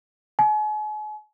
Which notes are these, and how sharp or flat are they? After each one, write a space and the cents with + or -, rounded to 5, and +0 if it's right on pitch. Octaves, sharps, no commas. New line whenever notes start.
G#5 +40